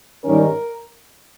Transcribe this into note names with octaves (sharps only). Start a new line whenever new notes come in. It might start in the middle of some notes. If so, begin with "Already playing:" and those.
G#2 D#3 G3 C#4 A#4